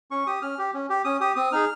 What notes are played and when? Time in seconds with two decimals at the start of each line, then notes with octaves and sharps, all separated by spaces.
0.11 C#4 C#6
0.27 G4 D#6
0.42 C#4 F6
0.58 G4
0.74 C#4
0.90 G4
1.04 C#4 D#6
1.20 G4 D#6
1.36 C4 D#6
1.52 D#4 G#4 F6